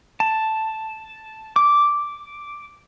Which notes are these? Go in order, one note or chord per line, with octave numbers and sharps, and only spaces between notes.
A5
D6